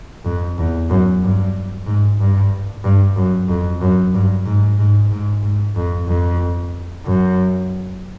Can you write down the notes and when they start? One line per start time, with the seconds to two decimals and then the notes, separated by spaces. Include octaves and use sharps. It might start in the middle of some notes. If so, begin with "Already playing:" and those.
0.25 F2
0.57 E2
0.90 F#2
1.22 G2
1.87 G#2
2.20 G2
2.84 G2
3.16 F#2
3.48 F2
3.81 F#2
4.13 G2
4.46 G#2
4.78 G#2
5.11 G#2
5.43 G#2
5.76 F2
6.08 F2
7.05 F#2